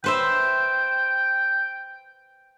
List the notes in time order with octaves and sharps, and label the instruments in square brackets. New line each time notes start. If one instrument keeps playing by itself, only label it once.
[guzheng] B4 C5 E5 [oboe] G5